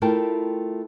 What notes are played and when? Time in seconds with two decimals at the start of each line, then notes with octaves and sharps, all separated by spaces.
0.02 A3 E4 F4 A#4 G5 A5